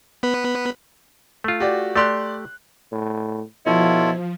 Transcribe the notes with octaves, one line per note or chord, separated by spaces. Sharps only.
B3 B4
A3 F4
F#4 G4 D5
A3 G4 D5 C6 F#6
A2
B2 F3 E4 F4 A4 C#5